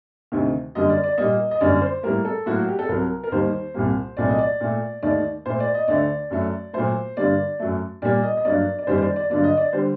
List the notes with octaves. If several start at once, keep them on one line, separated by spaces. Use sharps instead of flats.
D2 C3 D#3 A3
F#2 D3 G3 A#3 D#5
D5
D5
A#2 G3 A#3 D#5
D#5
F#2 D3 G3 A#3 D5
C5
A2 G3 A#3 A#4
A4
A2 F#3 A#3 F#4
F#4
G4
A4
C2 C3 F#3 A#4
A#4
D#2 D#3 G3 A#3 C5
C2 A#2 G3 A#3
C2 A#2 F#3 A3 D5
D#5
D5
A#2 A3
D#2 D#3 A3 D5
A#2 A3 C5
D5
D#5
D2 D3 A3 D5
F#2 F#3 A3
A#2 F#3 A3 C5
G2 D3 G3 A#3 D5
F#2 F#3 A3
A#2 G3 A#3 D5
D#5
D#5
G2 F#3 A#3 D5
D5
F#2 D#3 G3 A#3 C5
C5
D5
D5
G2 D3 F#3 A#3 D5
D#5
D5
D3 G3 C5